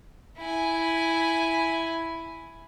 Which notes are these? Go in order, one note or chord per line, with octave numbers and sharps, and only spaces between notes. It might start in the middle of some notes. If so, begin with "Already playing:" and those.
E4 G#5